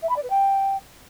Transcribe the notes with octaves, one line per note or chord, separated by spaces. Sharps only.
E5
B5
D5
B4
G5